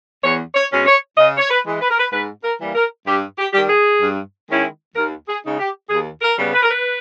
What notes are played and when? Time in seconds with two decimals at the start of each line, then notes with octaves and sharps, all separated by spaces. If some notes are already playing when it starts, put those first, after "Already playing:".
0.23 E2 C#5
0.55 C#5
0.71 B2 G#3 C#4
0.86 C#5
1.17 C#3 D#5
1.38 C#5
1.50 B4
1.66 E3 G#3
1.80 B4
1.89 A#4
1.99 B4
2.12 G#2 B4
2.43 A#4
2.60 E3 G3 A#3
2.75 A#4
3.07 G2 G4
3.38 G4
3.53 D#3 G3 G4
3.69 G#4
4.01 G2
4.49 D#3 G#3 C#4 E4
4.95 D#2 A#4
5.27 G#4
5.43 C#3 G#3 D#4
5.59 G4
5.89 D#2 G#4
6.22 A#4
6.37 C#3 G3 B3
6.54 B4
6.62 A#4
6.70 B4